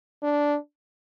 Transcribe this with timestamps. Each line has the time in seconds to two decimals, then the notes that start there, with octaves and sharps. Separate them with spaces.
0.23 D4